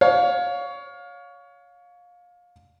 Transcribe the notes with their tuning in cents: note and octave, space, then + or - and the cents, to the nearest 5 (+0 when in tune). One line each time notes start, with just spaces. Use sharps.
C#5 +20 F5 +25